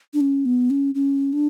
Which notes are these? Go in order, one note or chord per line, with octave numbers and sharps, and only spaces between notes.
D4
C#4
B3
C#4
C#4
D4